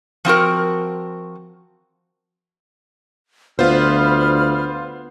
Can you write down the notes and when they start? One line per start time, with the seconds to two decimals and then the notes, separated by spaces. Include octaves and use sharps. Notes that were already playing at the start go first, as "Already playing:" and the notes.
0.25 F3 C4 F#4 A#4
3.59 D2 B3 F4 C5 B5 F6